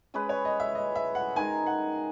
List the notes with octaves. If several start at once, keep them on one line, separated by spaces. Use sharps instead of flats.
G#3 C#4 G#4 B4
C#5
D#5
E5
D#5
E5
F#5
D#3 G#3 D#4 A#4 G#5
F#5